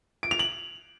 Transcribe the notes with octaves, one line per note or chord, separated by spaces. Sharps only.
D7
F7
F#7